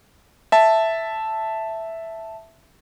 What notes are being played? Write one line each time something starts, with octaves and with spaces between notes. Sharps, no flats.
E5 A5